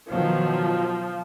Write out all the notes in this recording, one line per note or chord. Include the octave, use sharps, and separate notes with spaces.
B2 D#3 F3 F#3